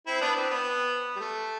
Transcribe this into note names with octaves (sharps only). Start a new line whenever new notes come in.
C4 E4
B3 D4
C4
B3
G3
A3